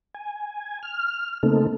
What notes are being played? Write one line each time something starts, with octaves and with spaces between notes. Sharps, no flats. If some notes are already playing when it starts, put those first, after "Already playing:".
G#5
F6
C#3 A3 A#3 C4 D#4 A4